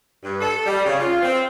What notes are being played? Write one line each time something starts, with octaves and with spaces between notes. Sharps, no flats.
G2
A4
G3
C#3
F4
C4